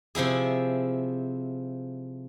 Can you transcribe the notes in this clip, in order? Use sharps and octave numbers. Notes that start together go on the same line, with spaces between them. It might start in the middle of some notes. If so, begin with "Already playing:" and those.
C3 F3 E4 G#4